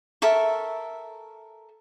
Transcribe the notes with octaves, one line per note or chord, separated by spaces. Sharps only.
A4 A#4 E5 C#6